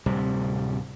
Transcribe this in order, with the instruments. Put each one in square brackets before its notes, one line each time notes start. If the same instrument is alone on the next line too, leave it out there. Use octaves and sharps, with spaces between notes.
[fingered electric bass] D1 C3 G3